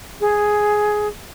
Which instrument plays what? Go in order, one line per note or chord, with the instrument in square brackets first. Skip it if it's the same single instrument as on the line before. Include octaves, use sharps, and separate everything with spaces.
[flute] G#4